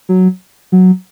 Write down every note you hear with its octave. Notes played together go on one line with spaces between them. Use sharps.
F#3
F#3